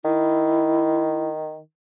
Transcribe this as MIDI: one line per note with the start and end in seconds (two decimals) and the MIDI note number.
0.05 1.60 51
0.05 1.30 64